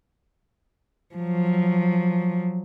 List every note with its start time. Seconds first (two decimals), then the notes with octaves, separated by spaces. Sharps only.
1.15 F3 F#3